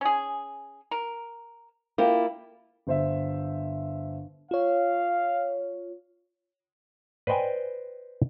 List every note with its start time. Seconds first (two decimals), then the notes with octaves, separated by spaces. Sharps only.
0.01 C#4 G#4
0.91 A#4
1.98 A#3 E4 F4 G4
2.87 G1 C5 E5
4.51 F4 C#5 F5
7.27 B4 C5 D5 D#5 G5 G#5